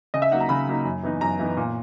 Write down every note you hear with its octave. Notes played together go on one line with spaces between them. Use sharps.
C#3 D#5
E5
F#3 A#3 D#4 F#5
A#5
C#3 B5
F#3 A#3 D#4
F#2
E3 B3 D#4
F#2 A#5
E3 B3 D#4
A#2